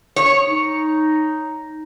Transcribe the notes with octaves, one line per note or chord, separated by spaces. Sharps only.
C#5
D#4